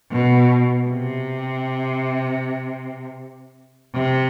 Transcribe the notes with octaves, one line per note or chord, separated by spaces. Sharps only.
B2
C3
C3